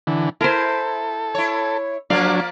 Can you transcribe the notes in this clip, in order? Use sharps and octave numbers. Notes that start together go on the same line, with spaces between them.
D3 E3
E4 A4 A#4 C5
E4 C#5
F3 F#3 A#3 D4 D5 F5